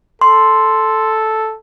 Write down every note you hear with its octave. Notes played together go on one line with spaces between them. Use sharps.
A4 C6